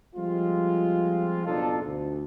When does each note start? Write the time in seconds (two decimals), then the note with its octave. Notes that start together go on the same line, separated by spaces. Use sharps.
0.15 F3 G3 G#3 C4 F4
1.46 F#1 B2 D4 D#4 F4 A4
1.83 D2